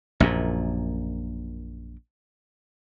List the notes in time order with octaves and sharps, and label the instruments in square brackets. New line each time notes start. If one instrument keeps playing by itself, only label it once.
[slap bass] A#1 F#2 A#2